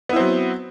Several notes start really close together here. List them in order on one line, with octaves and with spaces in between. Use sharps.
B3 E4 C4 F#3